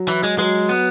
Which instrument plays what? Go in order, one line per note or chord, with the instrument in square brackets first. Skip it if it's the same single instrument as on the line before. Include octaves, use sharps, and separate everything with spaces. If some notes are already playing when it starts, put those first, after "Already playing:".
Already playing: [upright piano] F#3
[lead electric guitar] E3
G#3
[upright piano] F#3 [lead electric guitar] G#3
[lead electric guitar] B3